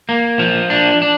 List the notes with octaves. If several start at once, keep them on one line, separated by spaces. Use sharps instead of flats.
A#3
F3
D4
D4